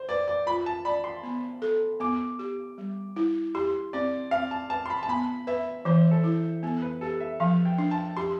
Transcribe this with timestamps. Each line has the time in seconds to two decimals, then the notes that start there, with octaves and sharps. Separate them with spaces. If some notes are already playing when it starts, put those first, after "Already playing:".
Already playing: C5
0.09 B4 D5
0.28 D5
0.46 F4 B5
0.66 A5
0.85 D5 B5
1.04 C6
1.23 B3
1.62 A4
2.00 B3 D6
2.39 G4
2.78 G3
3.16 E4
3.55 G4 C6
3.93 C4 D5
4.31 C4 F5
4.51 A5
4.70 B4 A5
4.86 C6
4.90 B5
5.03 A5
5.08 B3 B5
5.47 B4 E5
5.85 E3 C5
6.11 A4
6.24 E4
6.63 B3 A4
6.82 B4
7.01 G4 A4
7.20 E5
7.40 F3 F5
7.65 G5
7.78 D4
7.91 A5
8.17 G4 C6